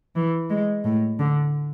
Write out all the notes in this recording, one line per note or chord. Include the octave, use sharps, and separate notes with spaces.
E3
G#3
A2
D3